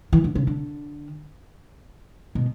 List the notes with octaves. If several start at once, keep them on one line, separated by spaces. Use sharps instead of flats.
E3
D3
C#3
D3
B2